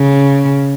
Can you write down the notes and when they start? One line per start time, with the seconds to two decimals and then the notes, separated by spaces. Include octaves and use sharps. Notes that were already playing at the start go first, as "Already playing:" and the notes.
Already playing: C#3